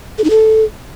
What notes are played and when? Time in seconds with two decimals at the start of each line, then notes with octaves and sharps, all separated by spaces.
0.18 A4
0.24 D#4
0.30 A4